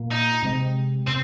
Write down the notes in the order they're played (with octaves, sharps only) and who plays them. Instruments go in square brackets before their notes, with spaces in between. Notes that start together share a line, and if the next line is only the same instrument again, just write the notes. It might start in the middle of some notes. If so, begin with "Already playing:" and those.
Already playing: [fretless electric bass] A#2 A#3
[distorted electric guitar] D#4
[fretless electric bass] C3 G#3 C4
[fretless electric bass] C3 [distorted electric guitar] C4